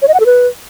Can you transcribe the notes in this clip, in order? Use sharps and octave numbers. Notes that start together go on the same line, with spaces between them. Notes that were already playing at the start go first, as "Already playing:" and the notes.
C#5
D#5
F#5
A4
B4